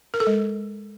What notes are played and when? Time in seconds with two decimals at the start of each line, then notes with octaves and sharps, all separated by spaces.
0.14 A#4
0.20 A4
0.27 G#3